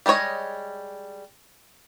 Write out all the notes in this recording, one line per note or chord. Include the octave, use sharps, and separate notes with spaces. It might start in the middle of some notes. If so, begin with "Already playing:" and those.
G3 G#3 D#4 C#5 D#5